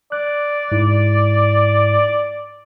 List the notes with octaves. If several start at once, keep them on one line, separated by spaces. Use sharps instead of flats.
D5 F#6
G#2 E4